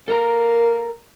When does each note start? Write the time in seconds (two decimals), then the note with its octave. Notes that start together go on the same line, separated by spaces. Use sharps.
0.08 A#3 A4 A#4 A#5